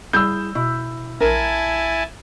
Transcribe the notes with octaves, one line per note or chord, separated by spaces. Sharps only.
G3 E4 G#4 E6 G6
B2 E4
A#1 E4 A#4 G#5 A5